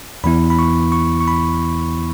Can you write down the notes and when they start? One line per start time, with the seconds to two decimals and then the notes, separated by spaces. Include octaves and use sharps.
0.24 E2 E3 B3 E4 B5
0.50 B5
0.59 C#6
0.92 C#6
1.21 C#6
1.28 B5